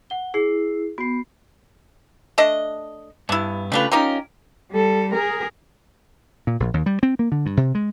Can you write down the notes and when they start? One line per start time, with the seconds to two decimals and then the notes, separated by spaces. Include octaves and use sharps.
0.10 F#5 G7
0.34 E4 G#4 C7
0.98 B3 F#4 C7
2.38 A3 D4 D#5
3.29 G2 B3 D4 E4
3.72 C#3 G3 A3 D4 F4 B4
3.92 C#4 D#4 F4 G4 A#4
4.72 G3 A4
5.14 G#4 A#4
6.47 A#2
6.60 A#1
6.74 D#2
6.86 G3
7.03 C4
7.19 A#3
7.32 D3
7.46 G2
7.57 C3
7.75 G#3